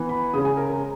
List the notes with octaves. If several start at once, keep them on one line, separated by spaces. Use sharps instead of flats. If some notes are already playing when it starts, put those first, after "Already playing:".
Already playing: E3 B3
B5
C#3 G#3 C#4 D#6
G#5
A#4
A#4